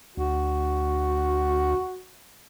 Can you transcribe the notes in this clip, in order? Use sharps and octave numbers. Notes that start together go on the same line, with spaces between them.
D2 F#4